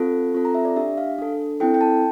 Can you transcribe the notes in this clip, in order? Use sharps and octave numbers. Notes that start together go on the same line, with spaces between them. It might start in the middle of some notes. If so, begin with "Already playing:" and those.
Already playing: C4 F4 A4
C4 F4 A4
A#5
E5
D5
D4 G4 E5
F5
D4 A4
C4 E4 A4 G5
G5
A5